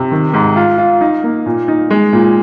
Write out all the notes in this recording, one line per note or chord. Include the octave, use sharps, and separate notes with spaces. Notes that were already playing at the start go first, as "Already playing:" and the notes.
Already playing: C3
D#3
G#2
F4
F4
D#4
A#3
A#2
D#4
G#3
A#2